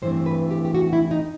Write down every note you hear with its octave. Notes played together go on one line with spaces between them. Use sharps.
G2 E3 A3 C4 C5
B4
G4
G4
F#4
E4
D#4